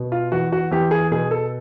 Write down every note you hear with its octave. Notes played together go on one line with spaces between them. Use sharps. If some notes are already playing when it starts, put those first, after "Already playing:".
Already playing: B2
F4
E2 F#4
F#4
E2 G4
G#4
B2 G#4
A4